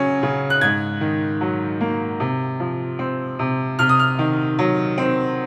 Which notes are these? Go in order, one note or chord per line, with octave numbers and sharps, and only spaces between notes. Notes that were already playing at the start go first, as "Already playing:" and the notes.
Already playing: C#3 F#3 C#4
C#3
F#6
G#2 G#6
D#3
F#3
A#3
C3
F3
C4
C3
C3 F6
D#6
F6
D#3
F#3
C4